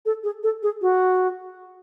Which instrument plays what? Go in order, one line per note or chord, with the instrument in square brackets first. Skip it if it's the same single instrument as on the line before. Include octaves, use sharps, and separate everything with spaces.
[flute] A4
G#4
A4
G#4
F#4